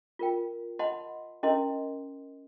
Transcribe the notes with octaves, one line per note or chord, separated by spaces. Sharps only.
F4 A#4 G5
D#5 F#5 A5 B5 C6
C#4 E4 A#4 D#5 C6